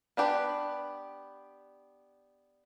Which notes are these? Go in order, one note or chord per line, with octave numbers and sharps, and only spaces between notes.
B3 D4 G4 B4